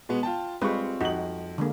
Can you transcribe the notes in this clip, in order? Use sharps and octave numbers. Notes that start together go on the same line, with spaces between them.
B2 G#3 B3
F4 G5 A5
G3 G#3 C4 F4 B4 C#6
F2 D#4 F#4 F#7
D3 G#3 A#3